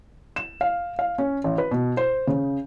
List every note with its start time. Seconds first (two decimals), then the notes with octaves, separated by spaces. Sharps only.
0.36 E7
0.61 F5
0.99 F5
1.18 C#4
1.44 A1
1.58 B4
1.71 B2
1.97 C5
2.27 C#3